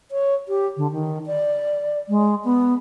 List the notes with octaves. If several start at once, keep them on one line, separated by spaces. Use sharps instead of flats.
C#5
G4
D3
D#3
D5
G#3
B3